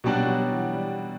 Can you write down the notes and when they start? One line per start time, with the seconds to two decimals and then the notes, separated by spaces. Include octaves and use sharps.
0.04 B2 F#3 G3 D4 F#4
0.27 F#3
0.50 E3
0.73 G3